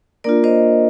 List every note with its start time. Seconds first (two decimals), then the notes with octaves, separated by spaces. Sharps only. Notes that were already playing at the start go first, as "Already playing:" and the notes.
0.24 A#3 D4 F4 A#4 D5
0.44 C5 D#5